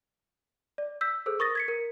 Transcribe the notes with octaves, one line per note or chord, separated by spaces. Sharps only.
D5
E6 G6 B6
G#4 A4 C5 E6
A#4 C#6 D#6 A6 A#6
G#6 B6 C#7
A#4